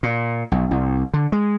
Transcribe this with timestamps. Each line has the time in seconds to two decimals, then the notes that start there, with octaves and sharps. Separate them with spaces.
0.03 A#2
0.52 B1
0.71 C2
1.14 D3
1.32 G#3